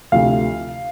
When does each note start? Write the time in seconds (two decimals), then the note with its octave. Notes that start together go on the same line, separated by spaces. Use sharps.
0.12 D2 C3 F3 F5